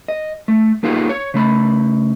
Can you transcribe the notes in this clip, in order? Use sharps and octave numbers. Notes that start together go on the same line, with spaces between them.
D#5
A3
A#3 B3 D#4 F4 G4 G#4
C#5
C#3 A3 B5